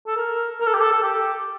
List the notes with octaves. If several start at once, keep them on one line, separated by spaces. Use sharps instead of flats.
A4
A#4
A#4
A4
G4
A4
A4
G4